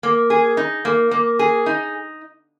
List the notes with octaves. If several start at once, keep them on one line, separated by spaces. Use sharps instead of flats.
A#3
G#4
D#4
A#3
A#3
G#4
D#4